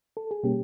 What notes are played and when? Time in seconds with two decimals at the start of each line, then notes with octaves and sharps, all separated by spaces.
0.17 A4
0.31 G#4
0.43 B2 G3 A#3 C#4 G4